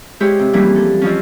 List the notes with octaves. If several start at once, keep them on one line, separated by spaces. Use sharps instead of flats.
G#3 E4 G4 C5 C#5
C3
E3 F3 G3 A#3 C#4 E4
A4
F2 F3 C#4